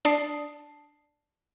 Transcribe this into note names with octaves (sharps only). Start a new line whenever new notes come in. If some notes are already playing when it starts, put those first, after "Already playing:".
D4 D5 A5 D#6 C7